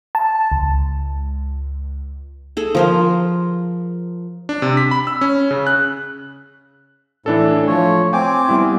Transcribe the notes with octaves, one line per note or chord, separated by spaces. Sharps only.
A5
C#2
G#4 A4
F3 A#4 C5
D4
C3
B6
B5
E6
C#4
C#3
F#6
A2 E3 D4 A4
F3 A3 C#5
C4 G5 G#5 D6
G3 B3 E4